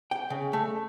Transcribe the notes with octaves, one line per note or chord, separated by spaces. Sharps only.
G5
C#3
A3